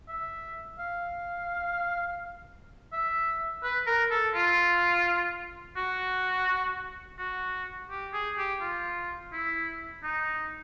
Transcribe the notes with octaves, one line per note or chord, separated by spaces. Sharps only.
E5
F5
E5
B4
A#4
A4
F4
F#4
F#4
G4
G#4
G4
F4
E4
D#4